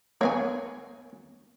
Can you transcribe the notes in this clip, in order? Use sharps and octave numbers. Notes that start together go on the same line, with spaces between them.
A#3 B3 C#5 F5 G#5